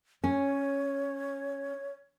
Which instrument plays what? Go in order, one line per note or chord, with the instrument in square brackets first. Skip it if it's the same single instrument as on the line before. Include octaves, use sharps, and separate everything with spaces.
[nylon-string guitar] C#4 [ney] C#5